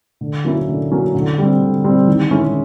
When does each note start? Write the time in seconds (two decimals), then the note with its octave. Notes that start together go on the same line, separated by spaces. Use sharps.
0.21 D3
0.44 F#3 A#3 C#4 E4
0.68 D3
0.91 F#3 A#3 C#4 E4
1.15 D3
1.38 G3 C4
1.61 D3
1.84 G3 C4
2.07 D#3
2.31 G#3 C#4 E4